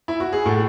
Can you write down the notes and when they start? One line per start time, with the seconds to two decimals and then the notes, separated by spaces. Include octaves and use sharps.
0.08 E4
0.20 F#4
0.33 G#4
0.46 A2 F#4 A4